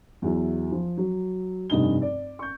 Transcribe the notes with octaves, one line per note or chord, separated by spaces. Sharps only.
E2 F#3 E4
F3
F#3
F1 G2 D#4 G7
D5
C#6 G6